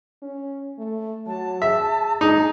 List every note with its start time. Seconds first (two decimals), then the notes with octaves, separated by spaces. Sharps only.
0.22 C#4
0.78 A3
1.27 F#3 A5
1.62 G#4 E5
2.21 G#3 D#4 G#4